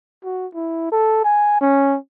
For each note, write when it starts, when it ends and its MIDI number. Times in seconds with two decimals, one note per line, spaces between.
0.24 0.47 66
0.54 0.88 64
0.92 1.23 69
1.24 1.57 80
1.61 1.97 61